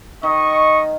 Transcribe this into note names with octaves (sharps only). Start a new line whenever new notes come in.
D#3 D#5 C#6